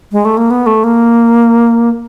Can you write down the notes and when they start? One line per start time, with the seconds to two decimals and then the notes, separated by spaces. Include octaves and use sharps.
0.12 G#3
0.25 A3
0.37 A#3
0.51 B3
0.66 A3
0.84 A#3